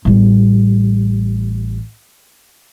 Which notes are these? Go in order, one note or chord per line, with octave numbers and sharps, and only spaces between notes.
A1 G3